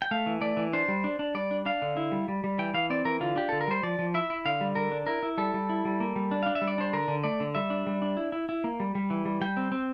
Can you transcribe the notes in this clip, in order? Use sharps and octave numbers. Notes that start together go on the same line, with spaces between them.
G5
A3 F5
E3
A3 D5
E3
D4 C5
G3
D4
D4
G3 D5
D4
D4 F5
D3
E4
G3
G3
G3
E3 G5
E3 F5
C4 D5
E3 A#4
D3 F4
D4 G4
D3 A4
A#4
G3 C5
F3 D5
F3
E4 E5
E4
D3 F5
G3
D3 A#4
D4
E4 A#4
E4
G3 A4
G3
E4
G3
A#3
G3
D4
D4 F5
E5
G3
D5
D4 C5
D3 A#4
D3
A3 D5
D3
G3 E5
D4
G3
D4
E4
E4
E4
A#3
G3
G3
E3
G3
G3 G5
C4
C4